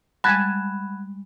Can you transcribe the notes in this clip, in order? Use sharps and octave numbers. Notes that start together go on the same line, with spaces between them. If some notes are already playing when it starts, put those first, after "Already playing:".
G3 G#3 F#5 G#5 A5 B5 F#6 G#6